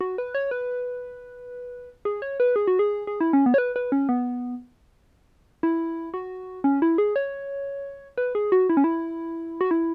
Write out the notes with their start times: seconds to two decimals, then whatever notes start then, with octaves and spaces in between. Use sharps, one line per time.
0.01 F#4
0.18 B4
0.35 C#5
0.51 B4
2.05 G#4
2.22 C#5
2.40 B4
2.56 G#4
2.67 F#4
2.79 G#4
3.07 G#4
3.21 E4
3.33 C#4
3.46 B3
3.54 C#5
3.58 B4
3.76 B4
3.92 C#4
4.09 B3
5.63 E4
6.14 F#4
6.64 C#4
6.82 E4
6.98 G#4
7.16 C#5
8.18 B4
8.35 G#4
8.52 F#4
8.70 E4
8.77 C#4
8.84 E4
9.61 F#4
9.71 E4